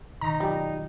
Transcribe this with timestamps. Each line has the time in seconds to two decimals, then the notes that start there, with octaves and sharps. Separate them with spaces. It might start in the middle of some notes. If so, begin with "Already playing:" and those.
0.21 B2 D#3 D#4 A#5 A#6
0.40 F#3 G3 F4